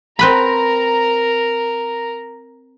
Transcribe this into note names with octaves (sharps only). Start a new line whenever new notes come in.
C4 A#4 B4 A#5 B5